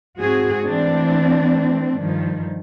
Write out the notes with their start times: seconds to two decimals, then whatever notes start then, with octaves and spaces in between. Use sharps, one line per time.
0.18 G#2 C4 F#4 G#4
0.65 E3 A3 C4 D4
1.97 G2 D#3 F3